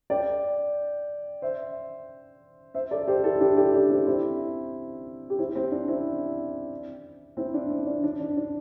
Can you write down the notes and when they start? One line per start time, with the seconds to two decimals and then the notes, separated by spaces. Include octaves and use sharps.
0.10 D5 G5
1.42 C5 E5
2.74 C5 E5
2.91 A4 D5
3.08 G4 C5
3.24 E4 A4
3.40 D4 G4
3.57 D4 G4
3.74 D4 G4
3.90 C4 E4
4.07 C4 E4
5.30 G4
5.39 C4 E4
5.55 C4
5.71 D4
5.88 C4 E4
7.37 C4 E4
7.54 D4
7.70 C4
7.86 D4
8.03 D4
8.20 D4
8.37 D4